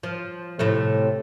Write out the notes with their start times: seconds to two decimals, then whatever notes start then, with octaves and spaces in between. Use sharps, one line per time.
0.03 F3
0.59 A2 C3 A3